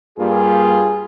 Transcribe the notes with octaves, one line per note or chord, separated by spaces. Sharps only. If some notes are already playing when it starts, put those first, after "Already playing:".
G2 G3 A#3 F4 G#4